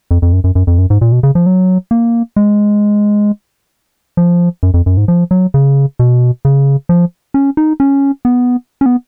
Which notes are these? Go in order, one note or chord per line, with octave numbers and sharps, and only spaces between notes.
F2
F2
F#2
F#2
F#2
F2
F#2
G#2
A#2
B2
C#3
F3
F#3
A#3
G#3
F3
F#2
F2
F#2
G#2
F3
F#3
C#3
B2
C#3
F3
C#4
D#4
C#4
B3
C#4
B3